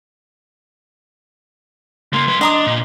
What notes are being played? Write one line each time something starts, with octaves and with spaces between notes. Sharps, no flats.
C#3 A#3 C6
F#3 B4
D4 D#5 A#5 D#6
A#2